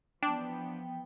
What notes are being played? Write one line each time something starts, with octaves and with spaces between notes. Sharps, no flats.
E3 F3 B3 D4 G5